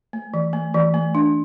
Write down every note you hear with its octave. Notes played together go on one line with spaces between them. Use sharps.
A3
E3
A3
E3
A3
D4